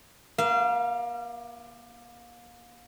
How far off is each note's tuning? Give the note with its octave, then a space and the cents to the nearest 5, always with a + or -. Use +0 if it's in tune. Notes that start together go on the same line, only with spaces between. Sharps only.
A#3 +35 F5 -30